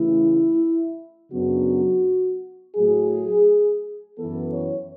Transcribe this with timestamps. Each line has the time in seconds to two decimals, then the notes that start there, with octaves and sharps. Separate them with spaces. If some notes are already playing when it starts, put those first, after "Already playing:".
Already playing: C#3 E3 A3 E4
1.32 F#2 C#3 F#3 B3 D4 F#4
2.76 A2 F#3 A3 G#4
4.18 F#2 E3 B3 A4
4.54 C#5